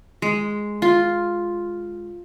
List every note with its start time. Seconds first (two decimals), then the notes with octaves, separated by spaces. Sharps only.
0.22 G#3
0.82 F4